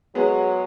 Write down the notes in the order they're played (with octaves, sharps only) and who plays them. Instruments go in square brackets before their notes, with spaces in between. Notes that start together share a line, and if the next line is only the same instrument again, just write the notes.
[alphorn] F#3 [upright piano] G#3 B3